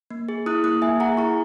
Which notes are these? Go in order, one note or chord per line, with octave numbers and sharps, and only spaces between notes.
A#3
G#4
E4 D#6 F#6
A#3 D#6 F#6
A#3 E5 G#5
G#4 F#5 A#5
E4 A#5 C#6